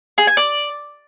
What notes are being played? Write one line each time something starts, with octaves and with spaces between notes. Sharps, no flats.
G#4
G#5
D5